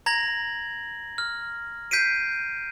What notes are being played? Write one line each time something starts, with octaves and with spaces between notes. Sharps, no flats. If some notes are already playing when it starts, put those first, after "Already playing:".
A#5 G#6 A#6 F#7
F6
G6 B6 C7 D7 D#7